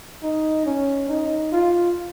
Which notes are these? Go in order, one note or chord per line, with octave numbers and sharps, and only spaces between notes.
D#4
C#4
D#4
F4